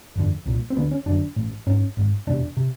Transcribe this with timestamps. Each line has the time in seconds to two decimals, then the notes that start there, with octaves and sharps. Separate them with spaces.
0.16 G1 F2 D3
0.46 C2 A#2
0.70 C4
0.76 D2 D3 B3
0.91 C#4
1.06 F#1 F#2 D3 D4
1.36 A1 A2
1.67 G#1 G#2 C#4
1.97 G#1 G#2
2.27 E1 E2 C3 D4
2.57 C3